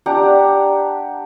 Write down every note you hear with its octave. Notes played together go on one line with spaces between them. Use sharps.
D4 G4 F#5 A#5